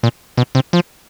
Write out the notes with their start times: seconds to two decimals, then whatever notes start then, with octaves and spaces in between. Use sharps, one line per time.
0.03 A#2
0.37 B2
0.55 C3
0.73 F3